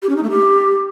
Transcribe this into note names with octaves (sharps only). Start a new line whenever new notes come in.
G4
C#4
D#4
A3
G4